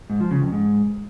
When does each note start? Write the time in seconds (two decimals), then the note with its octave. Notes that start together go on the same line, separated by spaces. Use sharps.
0.10 G#2
0.20 F3
0.31 C#3
0.42 F2
0.52 G#2